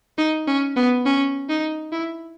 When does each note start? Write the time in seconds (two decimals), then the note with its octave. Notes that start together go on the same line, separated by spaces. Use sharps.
0.18 D#4
0.47 C#4
0.76 B3
1.06 C#4
1.49 D#4
1.92 E4